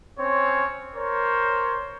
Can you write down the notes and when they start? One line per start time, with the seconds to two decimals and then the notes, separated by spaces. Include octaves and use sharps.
0.18 C4 C#4 C#5
0.95 A#4 C5 C#5